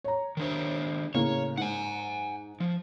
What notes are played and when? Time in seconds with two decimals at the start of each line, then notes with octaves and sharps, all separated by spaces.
0.04 C#5 A#5
0.37 D#3 D4 C5
1.15 A2 C#3 A#3 C#5
1.57 G#2 F#5 G#5
2.60 F3